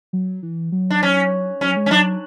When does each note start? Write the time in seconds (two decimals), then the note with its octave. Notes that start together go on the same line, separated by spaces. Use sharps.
0.13 F#3
0.43 E3
0.72 F#3
0.90 D4
1.03 C#4
1.61 F#3 C#4
1.77 G#3
1.86 C#4
1.91 F#3 D4